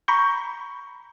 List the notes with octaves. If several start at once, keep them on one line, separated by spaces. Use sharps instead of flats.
A#5 B5 C#6 G6